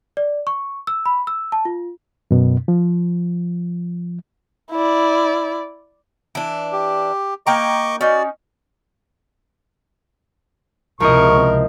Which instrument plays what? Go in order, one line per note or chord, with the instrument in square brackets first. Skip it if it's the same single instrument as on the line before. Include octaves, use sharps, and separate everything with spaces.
[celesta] D5
C#6
E6
B5
E6
A5
F4
[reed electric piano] F#2 B2
F3
[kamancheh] E4 D5
[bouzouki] E3 D4
[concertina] G4
[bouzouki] A#3 G5 A#5 [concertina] D#5 C#6 D6
[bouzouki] C#4 D#4 [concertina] F#4 D5
[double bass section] C#2 C3 [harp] F3 E4 D#5 [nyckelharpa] A#4 [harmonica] C#6